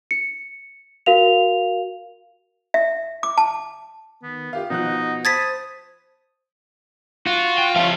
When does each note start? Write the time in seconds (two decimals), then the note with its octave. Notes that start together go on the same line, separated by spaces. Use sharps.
0.11 C#7
1.06 F#4 A#4 F5 F7
2.74 E5
3.23 D6
3.38 A5
4.23 D#3 B3
4.53 F4 G4 A#4 F5
4.70 B2 F3 D#4 F#5 F#6
5.25 C5 A5 B5 D#6 G#6 A6 B6
7.26 F4 F#4
7.58 G5
7.76 F3 C#4 E5 F5 A5